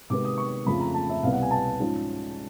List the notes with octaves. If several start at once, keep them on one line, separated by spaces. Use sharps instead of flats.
C3 D#3 G#3 B3 D6
D#6
C#6
F2 C#3 F3 A3 B5
A#5
A5
E5
C2 B2 G3 B3 F5
F#5
G#5
A5
G#2 F3 G#3 C#4